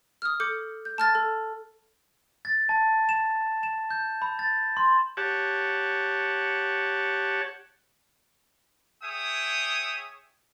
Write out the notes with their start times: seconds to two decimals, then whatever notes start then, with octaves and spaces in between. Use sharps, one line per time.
0.22 D#6 F6
0.40 A4 D6 G6 C#7
0.85 G6
0.98 A5 F6 A6
1.15 A4
2.45 A6
2.69 A5
3.09 E7
3.63 E7
3.90 G6
4.22 B5
4.39 A6
4.77 C6
5.17 G4 C#5 F#5 A5
9.03 G#4 C#5 E5 G5 D#6